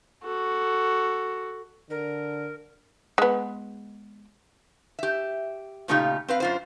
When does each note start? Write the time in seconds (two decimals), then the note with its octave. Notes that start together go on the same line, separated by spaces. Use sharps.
0.24 F#4 A4
1.90 D3 A#4
3.18 G#3 B3
4.99 G4 E5
5.88 A#2 C#3 A3 D#4 F4 G4
6.28 C4 B4 F5
6.40 F#2 F4 C5